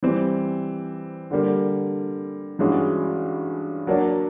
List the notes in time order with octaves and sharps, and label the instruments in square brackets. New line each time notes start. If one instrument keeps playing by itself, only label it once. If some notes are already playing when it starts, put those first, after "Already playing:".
[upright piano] E3 G3 C4
D3 G3 A#3
G2 E3 G#3 C#4 F#4
F#3 A#3 D4